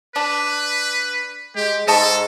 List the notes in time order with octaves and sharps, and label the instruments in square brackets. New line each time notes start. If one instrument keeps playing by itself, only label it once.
[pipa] D4 [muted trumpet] B4
[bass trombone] G#3 [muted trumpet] G4
[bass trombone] G#2 [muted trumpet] A4 [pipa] D#5 A5 C#6